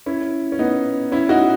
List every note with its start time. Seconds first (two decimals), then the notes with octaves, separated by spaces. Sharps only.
0.06 C#4 E4
0.52 C#4
0.59 B3 D#4
1.12 C#4 E4
1.29 D#4 F#4